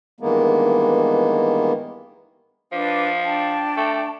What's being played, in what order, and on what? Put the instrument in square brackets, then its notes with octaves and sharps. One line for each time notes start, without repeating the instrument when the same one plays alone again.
[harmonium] G2 D#3 E3 G#3 A#3 B3
[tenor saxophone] F3 [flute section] D4 B4 D6
[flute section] D4 G5 A5
[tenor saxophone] A3